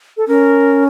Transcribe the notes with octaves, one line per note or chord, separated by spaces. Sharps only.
A4
C#4 A#4